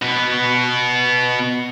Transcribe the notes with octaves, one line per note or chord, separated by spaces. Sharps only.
B2 B3